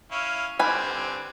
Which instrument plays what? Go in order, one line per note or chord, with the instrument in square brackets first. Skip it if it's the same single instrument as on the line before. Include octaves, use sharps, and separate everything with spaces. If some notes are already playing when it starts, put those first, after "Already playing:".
[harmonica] C#4 E4 F5
[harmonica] D3 G3 C4 [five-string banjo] B4 G#5